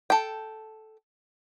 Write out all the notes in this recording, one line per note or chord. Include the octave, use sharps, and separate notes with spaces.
A4 G5